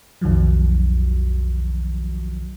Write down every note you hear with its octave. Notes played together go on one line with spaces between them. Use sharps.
B1 F2 D#3 F3 F#3